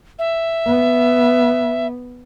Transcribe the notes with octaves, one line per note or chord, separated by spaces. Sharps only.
E5
B3